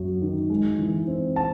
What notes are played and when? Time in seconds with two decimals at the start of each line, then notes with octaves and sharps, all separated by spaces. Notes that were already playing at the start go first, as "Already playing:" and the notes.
Already playing: F#2 F#3
0.22 D#3
0.50 G#3
0.79 E3
1.07 C4
1.36 A5